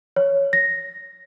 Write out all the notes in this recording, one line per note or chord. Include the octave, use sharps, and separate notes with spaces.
C#5
A#6